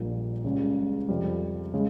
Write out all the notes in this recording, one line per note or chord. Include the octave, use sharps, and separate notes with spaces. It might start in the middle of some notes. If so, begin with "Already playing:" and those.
Already playing: A#1 A#2 G3 A#3
C#2 C#3 G3 C#4
F2 C3 G3
C#3 G#3